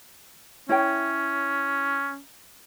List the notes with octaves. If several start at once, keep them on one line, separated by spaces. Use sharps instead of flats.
C#4 E4 C#5 G5